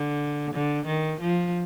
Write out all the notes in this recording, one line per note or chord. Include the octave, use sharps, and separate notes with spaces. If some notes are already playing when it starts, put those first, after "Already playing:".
Already playing: D3
D3
D#3
F3